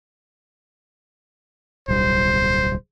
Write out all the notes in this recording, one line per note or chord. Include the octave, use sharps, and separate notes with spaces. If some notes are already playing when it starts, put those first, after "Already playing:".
D1 B1 G3 C5